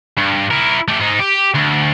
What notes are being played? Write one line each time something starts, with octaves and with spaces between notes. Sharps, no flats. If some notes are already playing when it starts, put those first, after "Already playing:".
G2
E4 A#4
A3 G4
G#2 D#4
G4
D2